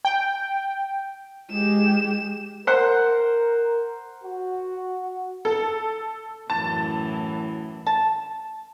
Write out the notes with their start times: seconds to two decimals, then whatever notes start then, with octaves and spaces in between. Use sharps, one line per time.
0.05 G5
1.51 G#3 G4 E7
2.67 A#4 C5 F#5
4.24 F#4
5.45 A4
6.50 F#2 A2 E3 A5
7.87 A5